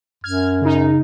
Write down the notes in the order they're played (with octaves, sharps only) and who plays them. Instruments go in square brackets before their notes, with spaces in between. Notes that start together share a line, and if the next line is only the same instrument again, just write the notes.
[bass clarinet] F#2 [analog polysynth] F6 G#6
[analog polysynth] C#3 D#4